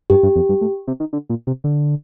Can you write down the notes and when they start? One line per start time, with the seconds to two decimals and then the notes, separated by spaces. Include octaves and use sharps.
0.10 G2 G4
0.23 G2
0.36 F2
0.49 G2
0.61 A2
0.87 C3
1.00 D#3
1.13 D3
1.30 A#2
1.47 C3
1.64 D3